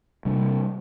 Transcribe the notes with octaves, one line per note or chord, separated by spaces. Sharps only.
C3 G3 D4